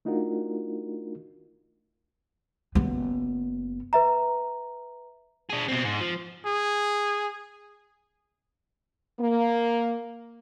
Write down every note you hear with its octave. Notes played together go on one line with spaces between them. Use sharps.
A3 D4 D#4 F4 F#4 A#4
F#1 B3
B4 E5 A#5
D4 G#4
B2 C4
G#2
F3
G#4
A#3